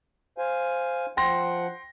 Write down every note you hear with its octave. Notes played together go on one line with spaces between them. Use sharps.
C5 F5 G#5
F3 F#5 G5 C6 A#6